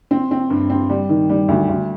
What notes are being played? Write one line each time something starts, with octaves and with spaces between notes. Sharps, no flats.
C4
C4
G2
C4
G3
D#3
G3
D2
D2